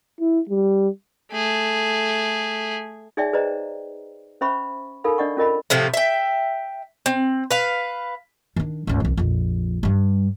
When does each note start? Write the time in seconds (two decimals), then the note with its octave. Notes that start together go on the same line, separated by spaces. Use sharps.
0.20 E4
0.49 G3
1.31 A3 G#4
3.17 D#4 G#4 C#5 D5 E5 G5
3.33 G#4 B4 C5 D5 D#5 A#5
4.41 C#4 C5 E5 B5 C#6
5.04 D#4 A4 A#4 F5 B5
5.18 D4 D5 D#5 F#5 C#6
5.37 C#4 F4 A#4 D#5 A5 B5
5.70 A2 C3 F3 A3
5.94 E5 G5
7.06 C4
7.51 B4 F5
8.56 D#3 D4
8.87 C#2 G#2
9.00 C2 E3
9.17 A#1 F2
9.83 G2 G3